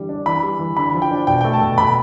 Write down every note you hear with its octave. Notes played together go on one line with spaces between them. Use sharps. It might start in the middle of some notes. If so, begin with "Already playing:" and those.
Already playing: D3 E3 G3
D4
E3 B5
G3
E3
D3 B5
F3
G5
D4
B2 G5
A3 G5
A5
B2
B2 B5